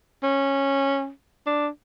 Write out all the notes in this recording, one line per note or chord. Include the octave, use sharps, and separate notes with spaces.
C#4
D4